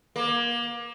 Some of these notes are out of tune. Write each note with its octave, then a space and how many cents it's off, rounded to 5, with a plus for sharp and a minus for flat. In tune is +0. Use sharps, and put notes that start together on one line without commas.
A#3 +30